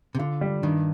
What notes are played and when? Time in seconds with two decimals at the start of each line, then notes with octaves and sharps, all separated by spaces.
0.15 C3
0.19 D3 F4
0.41 G3
0.63 G2 D#3